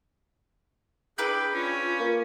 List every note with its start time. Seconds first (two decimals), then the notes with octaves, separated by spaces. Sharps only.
1.18 D4 E4 G#4 B4 G5
1.54 C#4 F4
2.00 A#3